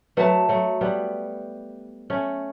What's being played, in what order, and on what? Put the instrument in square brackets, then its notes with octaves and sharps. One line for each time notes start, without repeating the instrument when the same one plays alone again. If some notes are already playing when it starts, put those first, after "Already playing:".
[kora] F#3 A3 [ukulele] B4 E5 A5
[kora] F#3 A3
G3 B3
A3 C#4